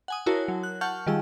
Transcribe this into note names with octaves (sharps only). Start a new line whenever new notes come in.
F#5 G#5 D#6
E4 F#4 A#4 C#5 A5
F#3
F#6
F#5 A5 C#6 F6 G6
D#3 G3 F4 G#4 E6